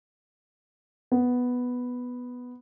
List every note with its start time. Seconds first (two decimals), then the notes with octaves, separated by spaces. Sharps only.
1.12 B3